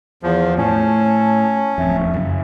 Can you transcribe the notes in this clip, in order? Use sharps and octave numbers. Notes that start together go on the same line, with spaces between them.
E2 F3
A2 C#4 A5
D1 F2 E5
F#2 C#3